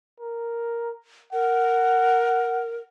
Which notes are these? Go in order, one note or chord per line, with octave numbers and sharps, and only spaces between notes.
A#4
A#4 F#5